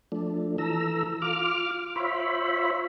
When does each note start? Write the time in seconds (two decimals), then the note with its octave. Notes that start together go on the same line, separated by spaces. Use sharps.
0.12 F3 A3 D4
0.58 E3 A4 A#5 E6
1.22 F4 D6 F6
1.96 F4 C5 C#5 E5 B5